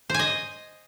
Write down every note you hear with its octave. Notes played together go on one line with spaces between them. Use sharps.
C5 D#5 G#5